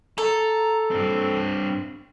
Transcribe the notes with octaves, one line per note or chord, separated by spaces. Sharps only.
A4 A#5
G2 C4